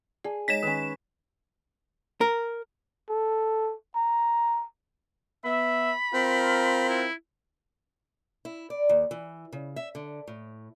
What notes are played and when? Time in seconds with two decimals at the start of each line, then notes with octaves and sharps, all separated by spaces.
0.24 G#4 D5 A5
0.48 G#3 D#4 C#5 A#6 B6 E7
0.63 D#3 C#4 B4
2.21 A#4
3.09 A4
3.95 A#5
5.45 B3 E5 B5
6.14 C4 F4 A#4
6.89 E4
8.45 E4
8.70 D5
8.89 D#2
9.11 E3
9.53 C#3
9.76 E5
9.95 D3
10.27 A2